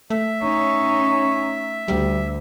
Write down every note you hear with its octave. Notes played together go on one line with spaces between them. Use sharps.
A3 E5
C#4 D#4 C#5
D2 G3